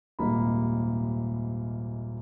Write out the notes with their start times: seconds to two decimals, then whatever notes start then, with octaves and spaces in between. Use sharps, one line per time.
0.19 D#1 G#1 C3 A#3 D#4 B5